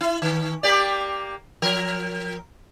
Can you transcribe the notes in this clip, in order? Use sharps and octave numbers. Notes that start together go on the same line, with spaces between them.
E4
D#3
A#3 G4 D5
F3 A#4